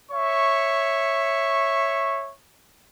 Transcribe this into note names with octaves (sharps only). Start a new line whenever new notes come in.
C#5 E5 C#6